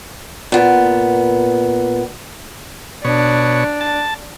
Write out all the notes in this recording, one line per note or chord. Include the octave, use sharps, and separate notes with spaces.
A#2 B3
B2 D4 C#5
A5